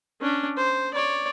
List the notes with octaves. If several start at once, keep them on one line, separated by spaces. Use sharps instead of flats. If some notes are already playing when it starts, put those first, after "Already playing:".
C#4 D4
C5
C#5 D5